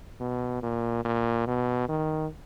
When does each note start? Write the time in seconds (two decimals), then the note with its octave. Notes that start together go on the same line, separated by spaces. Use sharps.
0.20 B2
0.62 A#2
1.05 A#2
1.47 B2
1.89 D#3